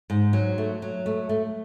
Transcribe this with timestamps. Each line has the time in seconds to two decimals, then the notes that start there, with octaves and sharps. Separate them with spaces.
0.10 G#2
0.33 F#3
0.58 A3
0.82 F#3
1.06 A3
1.29 A3